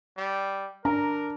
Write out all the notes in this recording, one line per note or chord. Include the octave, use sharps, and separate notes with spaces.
G3
D4 A#4 A#5